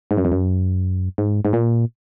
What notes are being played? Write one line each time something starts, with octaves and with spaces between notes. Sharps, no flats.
G#2
F#2
F2
F#2
G#2
G#2
A#2